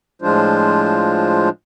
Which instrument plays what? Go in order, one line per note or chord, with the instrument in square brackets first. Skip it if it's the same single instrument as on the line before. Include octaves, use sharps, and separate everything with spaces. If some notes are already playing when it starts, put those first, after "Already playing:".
[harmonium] A2 F3 G#3 D4 F4 C5